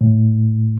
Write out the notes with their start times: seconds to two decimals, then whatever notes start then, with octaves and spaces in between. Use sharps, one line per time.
0.01 A2